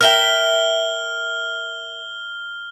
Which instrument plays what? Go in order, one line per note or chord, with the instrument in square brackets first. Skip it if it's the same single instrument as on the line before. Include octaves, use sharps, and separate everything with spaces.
[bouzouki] A#4 E5 G5 [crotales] F6 G7